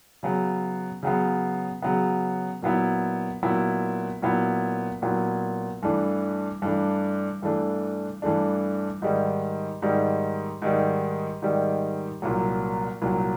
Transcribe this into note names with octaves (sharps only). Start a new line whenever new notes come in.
C#3 F#3 B3
C#3 F#3 B3
C#3 F#3 B3
A#2 F#3 B3 E4
A#2 F#3 B3 E4
A#2 F#3 B3 E4
A#2 F#3 B3 E4
G2 E3 A3 D4
G2 E3 A3 D4
G2 E3 A3 D4
G2 E3 A3 D4
G#2 D#3 G3
G#2 D#3 G3
G#2 D#3 G3
G#2 D#3 G3
C2 A#2 F#3
C2 A#2 F#3